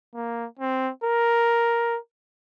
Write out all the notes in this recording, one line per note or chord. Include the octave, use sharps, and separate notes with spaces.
A#3
C4
A#4